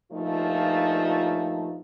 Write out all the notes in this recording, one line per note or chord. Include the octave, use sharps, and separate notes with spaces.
G2 A#2 F3 A3 D#4 F4